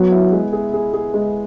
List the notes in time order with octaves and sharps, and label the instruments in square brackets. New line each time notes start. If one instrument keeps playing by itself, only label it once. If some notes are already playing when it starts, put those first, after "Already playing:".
Already playing: [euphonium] F#3 [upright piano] B3
[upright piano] E4
G#3
G#4
G#4
G#4
G#3